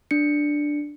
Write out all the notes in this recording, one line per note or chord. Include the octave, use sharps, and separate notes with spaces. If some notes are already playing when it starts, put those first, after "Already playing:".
D4 C#7